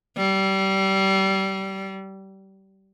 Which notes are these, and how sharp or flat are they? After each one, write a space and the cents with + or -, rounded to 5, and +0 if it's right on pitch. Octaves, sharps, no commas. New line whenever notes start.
G3 -25